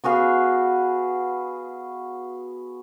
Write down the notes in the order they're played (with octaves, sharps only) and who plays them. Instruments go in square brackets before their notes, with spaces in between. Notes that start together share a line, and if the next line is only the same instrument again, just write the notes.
[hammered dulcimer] B3 F#4 G#4 F5